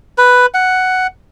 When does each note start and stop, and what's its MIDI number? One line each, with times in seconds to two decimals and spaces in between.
0.18 0.46 71
0.54 1.07 78